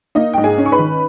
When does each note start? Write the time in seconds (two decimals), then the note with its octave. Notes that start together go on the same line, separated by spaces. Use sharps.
0.15 A#3 D#4 D#5
0.33 G#2 G5
0.44 G#4 G#5
0.58 C#4
0.66 C#6
0.72 B4 B5
0.79 D#3